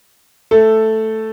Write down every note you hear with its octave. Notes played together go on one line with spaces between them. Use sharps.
A3 A4